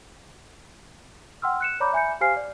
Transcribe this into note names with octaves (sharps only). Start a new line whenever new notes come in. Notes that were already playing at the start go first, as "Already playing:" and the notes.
F#5 G5 C6 E6 F6
F#6 C#7 E7
C#5 D5 A#5 B5 D6 G6
E5 G#5 B5 G6 C#7
G4 C5 F5 G#5 F6 C7
D5